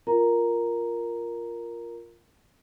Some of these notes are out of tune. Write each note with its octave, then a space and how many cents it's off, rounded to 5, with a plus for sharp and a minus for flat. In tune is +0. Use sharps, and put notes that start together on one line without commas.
F4 +0 A#4 +0 A#5 +0